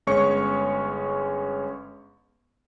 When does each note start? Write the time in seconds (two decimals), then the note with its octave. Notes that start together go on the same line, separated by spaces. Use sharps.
0.07 G1 G#3 C#4 C#5 C#6 C#7